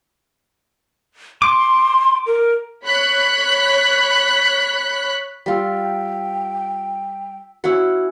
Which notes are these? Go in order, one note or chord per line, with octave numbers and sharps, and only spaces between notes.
C6 D6
A#4
C#5 B5 F#6 B6
G3 F4 G5 E6 B6
C#4 E4 F#4 F#5 G#5 E6